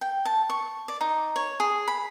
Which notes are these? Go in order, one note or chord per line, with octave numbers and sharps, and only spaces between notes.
G5
A5
C#6
D5
D#4
C#5
G#4
B5